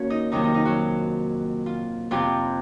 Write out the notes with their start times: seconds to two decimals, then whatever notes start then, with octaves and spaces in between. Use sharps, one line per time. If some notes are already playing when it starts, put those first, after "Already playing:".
Already playing: D#2 A#3 C#4 F#4 A#4 C#5
0.10 D#4 D#5
0.32 F2 C3 D#3 F#3 A#3 D#4 D#5
0.44 D#4 D#5
0.54 D#4 D#5
0.65 F#3 F#4
1.66 F4
2.11 F2 C3 F3 C4 F4